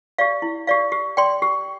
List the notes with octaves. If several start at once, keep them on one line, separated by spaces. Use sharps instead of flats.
G4 D5 F5
E4
G4 D5 F5
G4
D5 G5 C6
G4